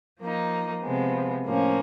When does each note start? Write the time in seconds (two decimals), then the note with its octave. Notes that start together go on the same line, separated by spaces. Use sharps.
0.21 F3 A#3 D#4
0.83 C3 F3 G#3 B3
1.45 A2 F3 A#3 C#4